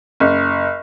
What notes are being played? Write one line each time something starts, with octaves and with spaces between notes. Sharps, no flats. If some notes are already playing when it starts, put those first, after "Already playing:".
F#1